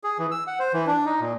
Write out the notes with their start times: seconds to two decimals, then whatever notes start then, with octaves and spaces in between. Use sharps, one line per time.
0.04 G#4
0.19 E3
0.31 E6
0.47 F#5
0.59 C5
0.74 E3
0.87 D4
1.06 D#4
1.20 A#2